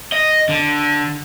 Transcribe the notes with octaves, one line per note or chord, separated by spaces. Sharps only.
D#5
D3